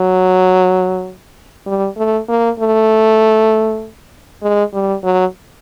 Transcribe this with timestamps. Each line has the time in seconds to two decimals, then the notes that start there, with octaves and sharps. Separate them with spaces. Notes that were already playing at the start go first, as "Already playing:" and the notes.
Already playing: F#3
1.67 G3
1.97 A3
2.29 A#3
2.60 A3
4.42 G#3
4.74 G3
5.04 F#3